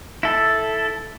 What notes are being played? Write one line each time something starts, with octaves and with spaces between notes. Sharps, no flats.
E4 A4